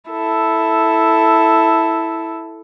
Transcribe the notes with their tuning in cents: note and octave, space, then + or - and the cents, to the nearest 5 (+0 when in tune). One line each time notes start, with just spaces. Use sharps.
E4 +0 A4 +0